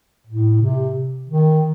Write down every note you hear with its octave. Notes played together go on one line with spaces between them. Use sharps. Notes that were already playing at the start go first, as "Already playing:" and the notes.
A2
C3
D#3